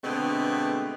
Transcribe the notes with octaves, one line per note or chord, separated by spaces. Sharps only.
B2 D3 G#3 A3 B3 C4